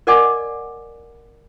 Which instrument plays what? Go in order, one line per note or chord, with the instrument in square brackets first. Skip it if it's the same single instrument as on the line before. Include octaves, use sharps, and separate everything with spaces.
[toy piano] A#4 D5 D#5 F#5 G#5 D6